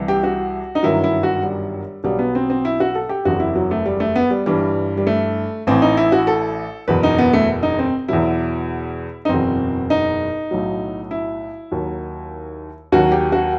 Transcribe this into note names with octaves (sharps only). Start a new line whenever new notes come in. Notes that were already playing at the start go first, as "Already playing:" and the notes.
Already playing: C2 C3 E3
G4
F#4
D#4
G1 F#2 D#3 F#3 E4
E4
F#4
G3
B1 B2 F#3 G3
B3
C4
C4
E4
F#4
A4
G4
F#1 E2 C3 F#4
E4
F#3
A3
G3
A3
B3
G3
G1 G2 E3 G3
G3
A3
A1 A2 E3 C4
D#4
E4
F#4
A4
F#1 E2 B2 B4
D#4
B3
A3
D#4
C4
E2 B2 F#3 E4
D#4
F#1 E2 B2 C4
D#4
B1 A2 F#3
E4
D#2 D#3 F#3
D#2 D#3 F#3 F#4
G4
F#4